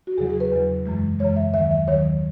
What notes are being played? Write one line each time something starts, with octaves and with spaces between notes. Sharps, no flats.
F#4
E2 C#3 F#3 G#4
G#4
B4
E2 C#3 F#3
F#2 C#3 E3 G#3
F#2 C#3 E3 G#3 C#5
E5
D#2 D#3 F#3 E5
E5
D#2 D#3 F#3 C#5